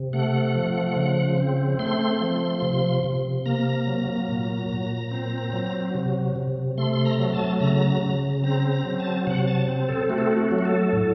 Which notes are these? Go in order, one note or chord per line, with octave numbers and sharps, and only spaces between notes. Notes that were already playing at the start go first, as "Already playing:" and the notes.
Already playing: C3
A3 F#5
F3
C#3
C4
A3 C6
F3
C3
C3
A#3 A#5
F#3
A#2
A#2
C4
F#3
C3
C3
A3 C6
C6
A#5
F#3
A5
C#3 A#5
C#3
C4 A#5
A#5
F#3
A5
C3 F#5
A5
C4
A4
A3 F#4
A4
F#4
F#4
F#3
F#4
A4
A2